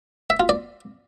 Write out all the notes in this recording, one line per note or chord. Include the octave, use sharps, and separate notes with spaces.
E5
F4
D5